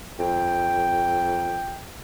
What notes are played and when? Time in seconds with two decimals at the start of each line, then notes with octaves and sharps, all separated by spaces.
0.19 F2 G5